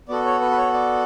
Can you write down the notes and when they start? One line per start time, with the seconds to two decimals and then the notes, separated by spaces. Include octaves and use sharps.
0.08 B3 F#4 A4 D5
0.25 C#5
0.41 B4
0.51 B4
0.57 C#5
0.74 D5